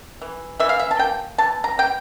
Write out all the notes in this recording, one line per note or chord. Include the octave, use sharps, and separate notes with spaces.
E3
E3 E5
F5
E5
A5
A#3 G5
E3 A5
A#5
E3 G5